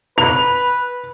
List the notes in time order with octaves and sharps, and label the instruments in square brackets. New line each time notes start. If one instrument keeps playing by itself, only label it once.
[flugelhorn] B4 [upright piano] F7